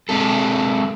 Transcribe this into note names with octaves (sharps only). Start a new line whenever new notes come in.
G#3 C4 A4